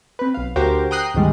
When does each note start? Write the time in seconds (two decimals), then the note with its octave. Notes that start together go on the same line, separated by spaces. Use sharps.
0.19 C4 B4
0.34 B1 F5
0.56 D2 F#4 G4 A#4 C5
0.91 G5 A#5 D#6 F#6 C7
1.14 D2 G#2 D#3 G3 G#3